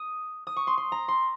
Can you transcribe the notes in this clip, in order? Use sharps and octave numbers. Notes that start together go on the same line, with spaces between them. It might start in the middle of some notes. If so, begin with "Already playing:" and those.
Already playing: D#6
D#6
C#6
C6
C6
A#5
C6